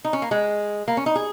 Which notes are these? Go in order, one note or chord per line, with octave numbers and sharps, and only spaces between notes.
D#4
C#4
A#3
G#3
A#3
C#4
D#4
G#4